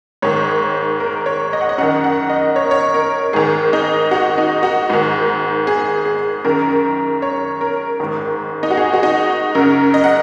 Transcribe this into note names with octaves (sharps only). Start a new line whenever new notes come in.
G#2 D#3 C#5
A#4
C#5
D#5
F#5
D#5
F#2 D#3 F#5
F#5
D#5
C#5
A#4
C#5
A#4
G#2 D#3 G#4
D#4
F#4
D#4
F#4
G#2 D#3
G#4
G#4
F#2 D#3 A#4
C#5
A#4
G#2 D#3
D#4
F#4
G#4
F#4
D#4
F#2 C#3 A#4
D#5
F#5